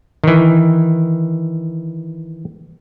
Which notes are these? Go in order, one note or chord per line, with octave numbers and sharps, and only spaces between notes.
D#3 E3